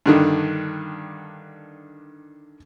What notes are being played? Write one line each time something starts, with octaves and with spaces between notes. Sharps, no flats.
G2 D3 D#3